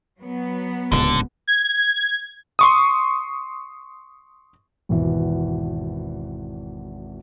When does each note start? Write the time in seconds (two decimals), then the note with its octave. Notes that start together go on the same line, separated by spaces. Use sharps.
0.20 F#3 B3
0.92 D1 C#2 A#2 D3
1.47 G#6
2.59 C6 C#6 D#6
4.89 G#1 E2 B2 E3